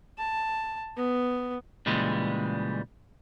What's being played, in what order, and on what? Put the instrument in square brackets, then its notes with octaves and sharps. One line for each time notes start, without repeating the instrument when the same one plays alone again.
[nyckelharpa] A5
B3
[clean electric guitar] A#2 C#3 E3 G3 G#3